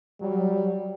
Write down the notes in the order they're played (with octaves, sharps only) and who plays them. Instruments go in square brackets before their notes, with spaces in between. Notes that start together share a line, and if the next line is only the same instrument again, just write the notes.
[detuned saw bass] F#3 [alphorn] G3